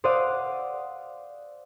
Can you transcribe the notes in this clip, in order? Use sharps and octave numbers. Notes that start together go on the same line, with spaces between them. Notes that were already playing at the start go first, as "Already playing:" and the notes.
C5 D5 F5 F#5 D#6 E6